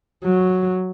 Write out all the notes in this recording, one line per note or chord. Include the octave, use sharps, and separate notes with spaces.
F#3